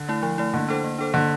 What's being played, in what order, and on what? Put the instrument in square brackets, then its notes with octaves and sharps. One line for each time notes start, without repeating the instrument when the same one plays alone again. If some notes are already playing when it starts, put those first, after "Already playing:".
Already playing: [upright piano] D3
[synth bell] A3 E4
F3
A3 E4
[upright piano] D3 [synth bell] A#3
[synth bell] D4 A4 C5
A#3
D4 A4 C5
[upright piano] D3 [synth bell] A#3